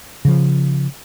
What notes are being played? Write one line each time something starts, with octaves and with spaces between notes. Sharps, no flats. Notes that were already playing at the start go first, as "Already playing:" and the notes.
C#3 F3